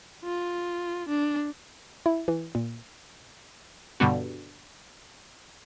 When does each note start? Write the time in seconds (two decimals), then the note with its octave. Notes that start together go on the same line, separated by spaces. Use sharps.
0.24 F4
1.09 D4
2.06 E4
2.28 E3
2.55 A#2
4.00 G2 B2 D3 G3 B3 F#4